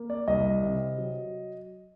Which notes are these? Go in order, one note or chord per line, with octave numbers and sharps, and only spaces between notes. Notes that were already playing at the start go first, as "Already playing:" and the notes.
Already playing: A#3
D5
C2 D#5
C3
F#3